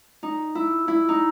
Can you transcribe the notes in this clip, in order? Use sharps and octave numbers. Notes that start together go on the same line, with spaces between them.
D#4
E4
E4
D#4